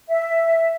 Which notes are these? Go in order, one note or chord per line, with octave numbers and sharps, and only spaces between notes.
E5